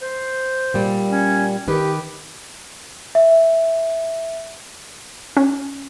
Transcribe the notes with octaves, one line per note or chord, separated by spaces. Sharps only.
C5
A#2 G3
C#4
D#3 G4 B4
E5
C#4